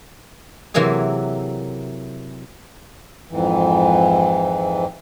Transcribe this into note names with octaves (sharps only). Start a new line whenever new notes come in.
C3 E3 F#3 A#3 G#4
F2 G#2 E3